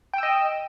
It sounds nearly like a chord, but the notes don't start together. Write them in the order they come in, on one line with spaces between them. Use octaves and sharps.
G5 E6 D#5